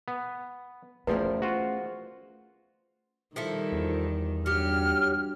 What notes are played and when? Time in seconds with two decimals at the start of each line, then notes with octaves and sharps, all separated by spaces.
0.08 B3
1.07 E2 F3 A3 C4 C#4 G#4 A#4 B4
1.42 F4 F#4
3.36 D#3 F3 G3 E4 A4
3.72 E2
4.46 G2 F#3 G4 F6